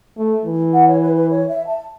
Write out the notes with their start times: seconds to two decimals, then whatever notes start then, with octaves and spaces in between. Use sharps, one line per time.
0.18 A3
0.45 E3
0.73 F#5
0.88 C#5
1.01 B4
1.15 B4
1.29 C#5
1.48 E5
1.67 A5